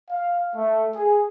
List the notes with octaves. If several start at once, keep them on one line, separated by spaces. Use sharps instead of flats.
F5
A3
G#4